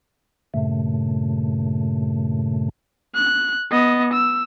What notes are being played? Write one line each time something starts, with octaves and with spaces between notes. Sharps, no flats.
G2 A#2 C#3 A3
F#6
B3 D#5
E6